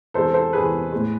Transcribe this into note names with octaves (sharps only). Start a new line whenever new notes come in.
E2 C3 G#3 A4 C5
A4 C5
E2 C3 G#3 G#4 B4
A2 G#3